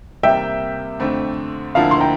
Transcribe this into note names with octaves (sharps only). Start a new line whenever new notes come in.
C3 G3 A#3 E5 G5
F2 D3 A3 C4
D2 D3 F3 A#3 E4 F5 A5
C6
G5 A#5